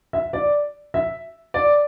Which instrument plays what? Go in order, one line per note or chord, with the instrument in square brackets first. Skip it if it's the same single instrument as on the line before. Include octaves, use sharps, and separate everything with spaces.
[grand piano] E5
D5
E5
D5